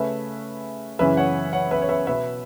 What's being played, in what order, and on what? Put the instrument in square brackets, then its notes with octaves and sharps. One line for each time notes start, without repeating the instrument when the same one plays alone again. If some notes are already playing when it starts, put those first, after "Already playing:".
Already playing: [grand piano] C#3 A3 C#4 B4 E5
F#2 C#3 E3 C#4 B4 E5
C#5 F#5
C#5 F#5
B4 E5
C#5
B4 E5
B2 B3 B4 E5